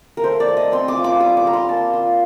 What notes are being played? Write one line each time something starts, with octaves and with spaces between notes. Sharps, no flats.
A#4
A3 C5
D5
A3
D#5
C4 C6
D6
F4
D6
G3 D#6
D6
G3 A#5
C6
A#3 A5
F4 C6